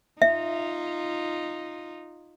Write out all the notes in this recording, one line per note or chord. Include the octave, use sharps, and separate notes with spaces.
D#4 F4 E5